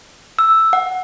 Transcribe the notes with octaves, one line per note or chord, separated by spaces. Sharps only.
E6
F#5